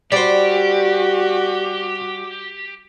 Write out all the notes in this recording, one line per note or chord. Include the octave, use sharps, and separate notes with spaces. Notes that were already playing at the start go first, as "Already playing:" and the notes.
G3 F#4 G4 C5 D5